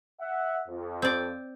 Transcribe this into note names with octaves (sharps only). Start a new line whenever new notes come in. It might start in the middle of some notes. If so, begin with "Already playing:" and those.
E5 F#5
F2
C4 D5